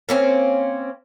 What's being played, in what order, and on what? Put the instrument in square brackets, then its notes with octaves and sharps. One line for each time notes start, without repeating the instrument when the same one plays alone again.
[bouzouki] A#3 C4 C#4